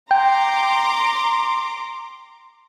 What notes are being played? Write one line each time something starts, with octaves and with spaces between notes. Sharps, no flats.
G5 A#5 C6 D6